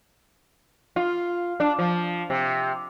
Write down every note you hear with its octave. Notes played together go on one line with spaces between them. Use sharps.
F4
D4
F3
C3